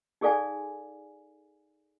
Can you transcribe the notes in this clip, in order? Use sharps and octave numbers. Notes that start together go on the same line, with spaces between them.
D#4 G#4 A4 D5 F5 G#5